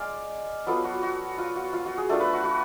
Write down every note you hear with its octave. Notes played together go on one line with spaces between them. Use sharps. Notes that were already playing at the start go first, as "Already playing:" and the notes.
Already playing: G#3 D5 F5 G#5
F#3 B3 F4 A4
F#4
F#4
F4
F#4
F4
F#4
G#4
A3 D4 F4 A4
B4
F#4
F#4